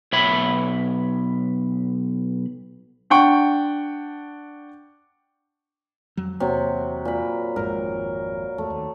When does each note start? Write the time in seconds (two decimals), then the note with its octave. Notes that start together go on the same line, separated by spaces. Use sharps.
0.13 B1 C#5 E5 B5
3.10 D4 F#5 G5 C#6
6.17 F2 F#3
6.40 E2 C3 F#3 A#3
7.05 A#2 B5
7.56 G#1 F2 G#2 A#4
8.58 E2 A3
8.70 D#2